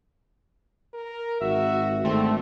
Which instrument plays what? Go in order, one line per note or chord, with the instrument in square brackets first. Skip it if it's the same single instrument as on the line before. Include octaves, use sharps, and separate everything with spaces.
[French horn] A#4
[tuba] G#1 [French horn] F#4 [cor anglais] E5
[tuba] G#1 [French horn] D3 [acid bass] A3 [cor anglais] C4